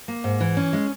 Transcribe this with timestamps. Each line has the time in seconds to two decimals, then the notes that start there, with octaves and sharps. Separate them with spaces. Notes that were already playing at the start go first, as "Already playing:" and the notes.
0.08 A#3
0.24 G#2
0.40 E3
0.57 C#4
0.73 G#3